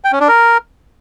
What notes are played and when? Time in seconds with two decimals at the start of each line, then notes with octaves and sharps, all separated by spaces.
0.04 G5
0.12 C#4
0.20 D4
0.28 A#4